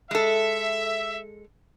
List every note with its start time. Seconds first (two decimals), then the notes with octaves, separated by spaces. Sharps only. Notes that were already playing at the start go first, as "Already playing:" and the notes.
0.11 G#3 A4 E5